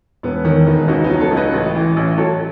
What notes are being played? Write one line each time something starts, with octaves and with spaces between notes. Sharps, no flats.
E1 B3
B3
D#3 C#4
E1 B3 D#4
C#2 D#4 F#4
B3 D#4
F#3
A4 C#5
C#2
B4 D#5
A1
E3
A1
F#3 A4 C#5